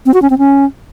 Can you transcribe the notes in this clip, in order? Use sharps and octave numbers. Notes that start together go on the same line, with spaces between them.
C4
F#4
C#4
C4
C#4